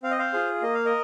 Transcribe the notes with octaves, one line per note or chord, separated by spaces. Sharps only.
C4 F5
D#5
C5 F5
F4 G#4
A#3 D#5
F5
A#4 D#5